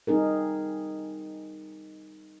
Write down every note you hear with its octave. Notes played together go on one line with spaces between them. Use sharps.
G3 C4 D#4 G#4 A#4